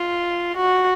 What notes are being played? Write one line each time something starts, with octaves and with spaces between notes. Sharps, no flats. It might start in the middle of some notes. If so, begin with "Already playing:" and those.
Already playing: F4
F#4